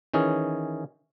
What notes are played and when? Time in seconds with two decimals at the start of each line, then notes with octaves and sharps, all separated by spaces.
0.14 D#3 E3 C#4 G#4